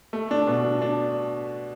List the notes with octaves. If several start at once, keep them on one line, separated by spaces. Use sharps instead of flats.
A3
D4
B2
D4
D4